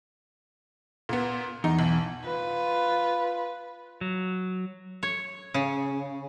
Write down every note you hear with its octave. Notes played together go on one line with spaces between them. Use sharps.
A#2 B3
E2 D#4
B1
F4 B4
F#3
C#5
C#3